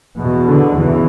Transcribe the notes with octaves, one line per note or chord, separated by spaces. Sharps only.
E2 B2
D3
E2 C#3 E3